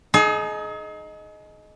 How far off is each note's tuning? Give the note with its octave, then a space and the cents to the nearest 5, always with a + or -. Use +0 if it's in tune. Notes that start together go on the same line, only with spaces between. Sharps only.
D#4 +0 G#4 +40